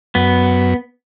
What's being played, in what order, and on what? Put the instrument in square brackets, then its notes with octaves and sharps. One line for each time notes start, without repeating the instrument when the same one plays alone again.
[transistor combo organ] F#2 [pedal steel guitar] B3